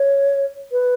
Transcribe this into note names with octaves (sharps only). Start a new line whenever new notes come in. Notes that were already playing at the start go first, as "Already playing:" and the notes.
Already playing: C#5
B4